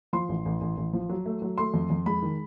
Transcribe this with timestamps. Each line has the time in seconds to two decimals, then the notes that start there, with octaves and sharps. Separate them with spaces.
0.13 F3 C6
0.29 A1
0.45 A1
0.61 A1
0.77 A1
0.93 F3
1.09 F#3
1.26 A3
1.42 F#3
1.58 A3 C6
1.74 F2
1.90 F2
2.06 G#3 B5
2.22 D#3